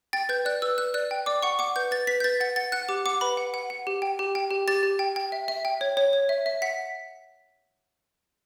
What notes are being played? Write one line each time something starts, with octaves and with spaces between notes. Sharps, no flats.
G5 A6
B4 G6
D5 F#6
B4 E6
B4 F#6
D5 F#6
G5
D5 D6
F#5 C#6
F#5 D6
B4 G6
B4 A6
B4 B6
G6
B4 A6
F#5 A6
F#5 A6
F#5 F#6
G4 D6
F#5 D6
B4 B5
F#5
F#5
F#5
G4
G5
G4
G5
G4
G4 A6
G4
G5
G5
E5
E5
G5
C#5
C#5
C#5
E5
E5
F#5 B6